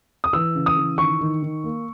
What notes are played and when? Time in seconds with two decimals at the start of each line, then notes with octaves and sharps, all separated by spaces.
0.24 D#6
0.33 E3 E6
0.55 C#3
0.66 D#6
0.77 E3
0.98 D#3 C#6
1.21 D#3
1.42 D#3
1.64 A#3